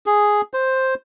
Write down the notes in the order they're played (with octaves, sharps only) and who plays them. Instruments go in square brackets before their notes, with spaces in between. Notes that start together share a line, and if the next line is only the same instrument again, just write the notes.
[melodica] G#4
C5